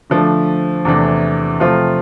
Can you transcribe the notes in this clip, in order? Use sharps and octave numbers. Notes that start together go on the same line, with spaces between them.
D3 F3 A3 D4
E2 C3 E3 A3 D4
C3 F3 A3 C4 F4